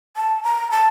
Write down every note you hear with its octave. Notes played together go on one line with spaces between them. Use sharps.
A5
A#5
A5